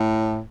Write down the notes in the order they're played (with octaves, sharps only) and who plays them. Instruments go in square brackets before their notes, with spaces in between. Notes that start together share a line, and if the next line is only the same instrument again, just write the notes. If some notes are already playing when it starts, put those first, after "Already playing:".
Already playing: [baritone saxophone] A2